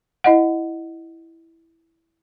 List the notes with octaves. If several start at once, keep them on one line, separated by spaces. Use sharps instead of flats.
E4 D#5 F#5